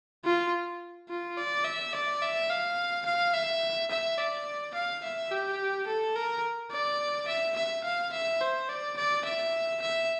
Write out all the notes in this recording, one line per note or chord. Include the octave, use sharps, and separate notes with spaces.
F4
F4
D5
E5
D5
E5
F5
F5
E5
E5
D5
F5
E5
G4
A4
A#4
D5
E5
E5
F5
E5
C5
D5
D5
E5
E5